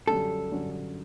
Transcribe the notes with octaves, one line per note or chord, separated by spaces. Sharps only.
F#2 D3 G3 C#4 A4
F#2 D3 G3 C#4